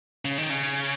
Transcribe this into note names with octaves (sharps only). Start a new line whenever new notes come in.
C#3
D#3
C#3